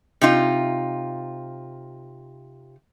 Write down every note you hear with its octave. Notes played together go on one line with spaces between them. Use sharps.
C3 D#4 F4